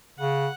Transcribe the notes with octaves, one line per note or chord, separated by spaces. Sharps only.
C#3 F#5